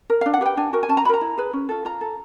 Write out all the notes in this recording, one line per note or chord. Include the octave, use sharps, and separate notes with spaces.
A#4
D4 F5
F#5
G4 B4 G5
D4 G#5
F#4 A#4
G#5
C#4 A5
A#5
F#4 A#4 A#5 B5
E4
G#4 B4
C#4
F4 A4
F4 A#5
A4